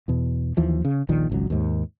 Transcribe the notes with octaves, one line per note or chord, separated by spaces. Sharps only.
E2 B2
D#2 E3 F3
C#3
D#1 A#1 A#2 D#3
G#1 C#2 F#3
D#2 G#2